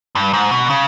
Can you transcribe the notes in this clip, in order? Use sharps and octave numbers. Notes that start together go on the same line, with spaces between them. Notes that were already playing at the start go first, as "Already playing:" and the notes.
G2
G#2
B2
C#3